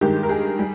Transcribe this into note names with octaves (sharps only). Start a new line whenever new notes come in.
G2 D#3 G#3 G4
A#4
G#4
G3